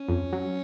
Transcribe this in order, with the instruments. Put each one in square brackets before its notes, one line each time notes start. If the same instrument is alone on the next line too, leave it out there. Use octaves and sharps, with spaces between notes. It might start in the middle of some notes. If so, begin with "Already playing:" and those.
Already playing: [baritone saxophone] C#4
[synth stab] F2
F#3